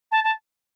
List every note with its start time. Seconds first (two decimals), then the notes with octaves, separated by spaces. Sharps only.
0.11 A5
0.24 A5